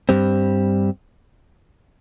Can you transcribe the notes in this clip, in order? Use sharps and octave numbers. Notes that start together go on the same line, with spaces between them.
G2 G3 C4